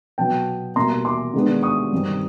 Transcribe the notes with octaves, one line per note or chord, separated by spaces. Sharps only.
B2 F#3 B3 G5 A5
B2 G3 A#3 A#5 C6
C6 D6
D#3 G#3 B3 D4
C#6 D#6
G2 D#3 G3 C4